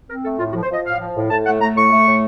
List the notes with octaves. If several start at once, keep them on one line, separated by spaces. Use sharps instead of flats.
C4 A#4
A3 A4
A2 F4
F#4
F3
C5
F3 D#5
A2 F5
F3
A2
A2 A5
A3 F#5
A3 A#5
A2 C#6
A3
A2